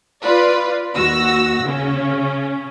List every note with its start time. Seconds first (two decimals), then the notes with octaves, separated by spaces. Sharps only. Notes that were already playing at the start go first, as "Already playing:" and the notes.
0.23 F4 B4 D5
0.95 D#2 F#4 E6 A#6
1.63 C#3 C#4